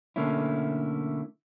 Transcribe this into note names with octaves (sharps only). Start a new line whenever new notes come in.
B1 D3 A3 A#3 C#4 E4